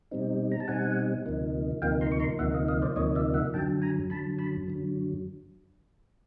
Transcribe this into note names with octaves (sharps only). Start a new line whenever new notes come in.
B2 G3 C4 D#4
A#5
A5
B2 G3 C4 D#4 F#5 G#5
D2 C3 F3 A#3 D#4
D2 C3 F3 A#3 D#4 F5 G5
A#5 C6
C#6
A#5 C6
D2 C3 F3 A#3 D#4 E5 F#5
D#5 F5
D#5 F5
C5 D5
D2 C3 F3 A#3 D#4 C#5 D#5
D5 E5
E5 F#5
F#2 D3 F#3 G5 A5
G#5 A#5
F#2 D3 F#3 A5 B5
A5 B5
F#2 D3 F#3